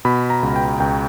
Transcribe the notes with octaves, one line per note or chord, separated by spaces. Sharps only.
B2 B5
A#5
C#2
G5
C#2 G5